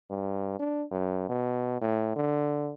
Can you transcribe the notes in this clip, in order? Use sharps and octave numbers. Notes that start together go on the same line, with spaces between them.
G2
D4
F#2
B2
A2
D3